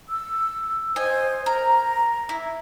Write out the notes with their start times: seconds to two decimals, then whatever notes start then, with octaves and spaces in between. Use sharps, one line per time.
0.09 E6
0.96 C5 D#5 G5 G#5
1.46 A#4 A#5
2.29 E4